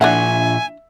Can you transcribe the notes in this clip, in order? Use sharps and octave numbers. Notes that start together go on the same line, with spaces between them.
A#2 F3 D4 E4 E5 F#5 G#5